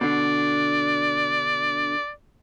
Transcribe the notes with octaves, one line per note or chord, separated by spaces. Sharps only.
B2 D3 D5